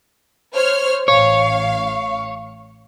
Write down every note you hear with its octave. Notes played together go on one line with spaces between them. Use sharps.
C5 C#5 F6
A1 C#5 F5